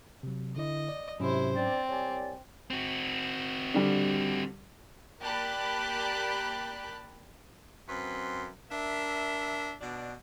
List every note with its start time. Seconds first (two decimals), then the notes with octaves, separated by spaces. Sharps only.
0.23 C3 F#3
0.56 D3 E4 D#5
0.89 D5
1.20 G#2 C3 F#3 C#4 E4 C5
1.55 C4 D4 C5 D5
1.89 C2 C#5 D5 G#5
2.71 C4 F#4
3.74 D3 G3
5.22 A#3 G4 D5 A5 B5 F#6
7.88 F#2 C4 B4 C6
8.71 D4 A#4 E5
9.81 B2 D4